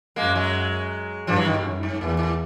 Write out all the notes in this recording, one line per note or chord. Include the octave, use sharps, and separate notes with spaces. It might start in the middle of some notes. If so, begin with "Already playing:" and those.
F#2 G#3 A#3
F#3 G#3
G2 F3 G3
E3 F#3
D#3 F3
B2
F#2
G#2
E2 A2
A2